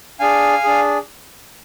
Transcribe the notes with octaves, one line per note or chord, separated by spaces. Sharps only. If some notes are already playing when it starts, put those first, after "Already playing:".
D4 G#4 F5 G#5
D4 G#4